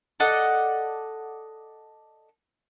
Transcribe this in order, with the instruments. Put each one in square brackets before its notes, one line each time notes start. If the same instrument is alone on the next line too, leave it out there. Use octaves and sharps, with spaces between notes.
[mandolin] A4 D5 D#5 F#5